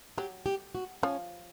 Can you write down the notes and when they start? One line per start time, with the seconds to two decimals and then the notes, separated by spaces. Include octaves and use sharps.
0.18 F#3 G4
0.46 G4
0.75 F#4
1.03 F3 C#4